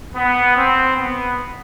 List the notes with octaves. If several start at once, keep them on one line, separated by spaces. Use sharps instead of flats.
B3
C4
B3